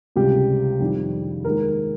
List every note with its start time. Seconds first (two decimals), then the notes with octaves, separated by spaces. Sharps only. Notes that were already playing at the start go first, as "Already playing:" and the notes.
0.16 C#2 C3 G3 G4
0.80 F2 D#3 G3
1.44 D#2 D#3 G#3 A#4